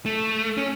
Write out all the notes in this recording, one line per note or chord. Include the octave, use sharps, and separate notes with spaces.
A3
C#4